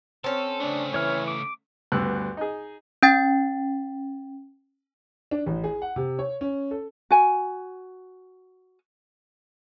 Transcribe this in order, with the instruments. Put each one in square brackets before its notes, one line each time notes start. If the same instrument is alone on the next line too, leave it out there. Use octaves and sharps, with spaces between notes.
[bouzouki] C4 C#4 [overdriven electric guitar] A4
[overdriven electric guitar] C#3 A3 [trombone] D4
[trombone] E3 [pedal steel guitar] C#5 F6
[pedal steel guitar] D6
[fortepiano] D2 G2 B3 E6 F#6
D#4 G#4
[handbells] C#4 G5 A6
[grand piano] D4
A1
G#4
F#5
C3
C#5
C#4
A4
[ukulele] F#4 G#5